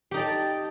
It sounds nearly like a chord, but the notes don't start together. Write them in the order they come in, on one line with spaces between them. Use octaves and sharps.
G4 D#4 D5 A5